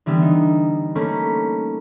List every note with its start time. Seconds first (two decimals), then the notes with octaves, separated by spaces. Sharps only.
0.06 D3 E3 G3 B3
0.22 D#4
0.95 A3 A#3 C#4 B5